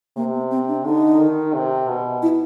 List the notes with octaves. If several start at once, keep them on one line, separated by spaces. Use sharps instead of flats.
C3 A#3
B3
C4
D4
D3 D#4
D#3
C3
B2
E4